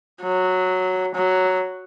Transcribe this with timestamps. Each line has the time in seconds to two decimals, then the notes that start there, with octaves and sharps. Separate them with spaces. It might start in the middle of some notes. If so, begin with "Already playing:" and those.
0.22 F#3
1.15 F#3